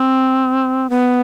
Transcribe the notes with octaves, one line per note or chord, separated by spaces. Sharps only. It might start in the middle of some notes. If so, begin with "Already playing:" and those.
Already playing: C4
B3